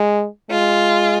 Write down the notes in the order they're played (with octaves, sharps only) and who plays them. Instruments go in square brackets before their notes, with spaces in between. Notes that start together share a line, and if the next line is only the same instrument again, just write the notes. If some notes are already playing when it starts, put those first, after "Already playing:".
Already playing: [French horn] G#3
[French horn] G#3 [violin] F4